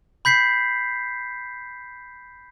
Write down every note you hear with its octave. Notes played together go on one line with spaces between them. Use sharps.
B5 G6 B6 C7